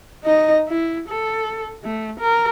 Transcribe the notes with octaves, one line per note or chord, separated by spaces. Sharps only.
D#4 D#5
E4
A4
A3
A#4